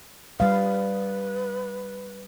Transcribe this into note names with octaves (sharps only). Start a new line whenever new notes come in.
G3 B4 F5